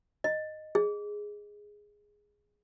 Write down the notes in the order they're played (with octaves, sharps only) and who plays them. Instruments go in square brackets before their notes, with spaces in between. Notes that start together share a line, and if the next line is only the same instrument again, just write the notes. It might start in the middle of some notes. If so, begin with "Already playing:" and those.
[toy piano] D#5
G#4